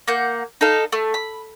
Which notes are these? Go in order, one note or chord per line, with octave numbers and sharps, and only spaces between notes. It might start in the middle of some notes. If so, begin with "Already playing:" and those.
A#3 F#5 G6
D#4 A4 F5
A3
B5